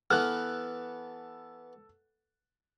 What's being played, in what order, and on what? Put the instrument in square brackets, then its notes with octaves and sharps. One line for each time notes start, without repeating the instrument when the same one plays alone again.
[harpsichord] E3 B3 [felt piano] A4 F#6 [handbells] F6